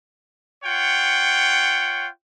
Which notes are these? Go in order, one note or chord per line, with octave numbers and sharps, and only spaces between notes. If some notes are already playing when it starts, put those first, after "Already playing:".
F4 C#5 F#5 G5